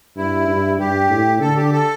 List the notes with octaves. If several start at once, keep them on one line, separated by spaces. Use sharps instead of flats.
G2 E4
G2
G2 G4
A2
D3 A4
G4
A4